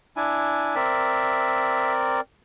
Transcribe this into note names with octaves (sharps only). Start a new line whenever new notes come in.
D4 E4 G#5
C4 A#4 D5 E5